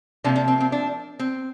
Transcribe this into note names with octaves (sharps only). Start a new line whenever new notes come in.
C3 F3 A#3 D4
D4
C4
C4
D4
C4